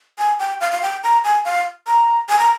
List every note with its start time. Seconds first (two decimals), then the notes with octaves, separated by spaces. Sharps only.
0.18 G#5
0.39 G5
0.61 F5
0.72 F5
0.82 G5
1.04 A#5
1.24 G#5
1.45 F5
1.87 A#5
2.29 G#5
2.39 A#5